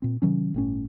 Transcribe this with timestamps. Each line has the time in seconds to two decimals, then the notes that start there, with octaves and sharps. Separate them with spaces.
0.02 A#2 C4
0.22 C3 D#3 F#3 C#4
0.54 G1 A2 C#4